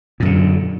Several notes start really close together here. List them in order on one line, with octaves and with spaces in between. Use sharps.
A#2 F#2 D3